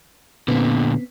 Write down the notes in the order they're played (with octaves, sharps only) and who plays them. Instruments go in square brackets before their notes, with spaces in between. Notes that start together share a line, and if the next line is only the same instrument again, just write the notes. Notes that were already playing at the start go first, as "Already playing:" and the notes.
[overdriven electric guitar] A#2 D3 [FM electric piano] B3 C4